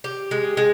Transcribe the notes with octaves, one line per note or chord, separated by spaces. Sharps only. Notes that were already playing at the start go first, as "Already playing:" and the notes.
G4
G#3
G#3